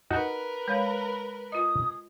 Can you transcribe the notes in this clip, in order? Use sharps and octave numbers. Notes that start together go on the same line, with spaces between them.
D#4 F#4 A#4 B4 F#5
G#3 C#5 F5 B5
F4 D#5 D#6